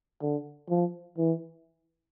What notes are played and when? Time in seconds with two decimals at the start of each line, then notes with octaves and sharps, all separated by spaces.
0.22 D3
0.70 F3
1.18 E3